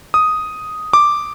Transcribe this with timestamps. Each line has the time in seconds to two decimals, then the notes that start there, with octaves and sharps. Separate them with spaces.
0.14 D#6
0.93 D6